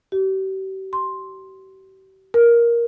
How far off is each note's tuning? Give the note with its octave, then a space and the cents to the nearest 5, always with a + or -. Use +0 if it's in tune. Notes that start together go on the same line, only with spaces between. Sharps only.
G4 -40
C6 +5
A#4 +10